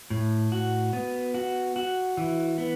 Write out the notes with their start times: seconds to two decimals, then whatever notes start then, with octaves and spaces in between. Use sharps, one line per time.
0.10 A2
0.52 F#4
0.93 B3
1.34 F#4
1.76 F#4
2.17 E3
2.58 B3